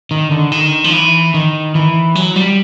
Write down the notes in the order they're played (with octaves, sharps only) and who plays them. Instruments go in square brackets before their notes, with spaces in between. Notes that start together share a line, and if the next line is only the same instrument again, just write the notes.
[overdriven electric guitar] D#3
D3
D#3
F3
E3
D#3
E3
F#3
G3